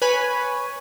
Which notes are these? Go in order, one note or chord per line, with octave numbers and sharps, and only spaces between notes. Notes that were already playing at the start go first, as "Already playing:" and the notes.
B4 C#5 G#5 B5